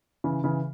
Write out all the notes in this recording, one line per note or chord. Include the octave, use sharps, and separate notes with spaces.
C#3 E3
C#3 E3